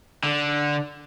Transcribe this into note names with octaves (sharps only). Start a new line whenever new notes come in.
D3